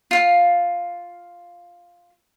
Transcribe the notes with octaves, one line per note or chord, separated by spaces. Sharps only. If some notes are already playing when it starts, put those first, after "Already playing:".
F4 F5